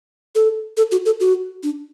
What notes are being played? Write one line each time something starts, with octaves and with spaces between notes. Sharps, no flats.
A4
A4
F#4
A4
F#4
D4